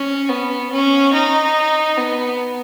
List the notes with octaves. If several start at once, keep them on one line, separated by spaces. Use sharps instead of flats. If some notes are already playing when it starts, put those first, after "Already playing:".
Already playing: C#4
B3
C#4
D#4
B3